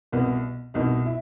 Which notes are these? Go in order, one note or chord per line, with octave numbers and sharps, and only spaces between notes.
C2 B2 B3
C2 B2 D#4
E4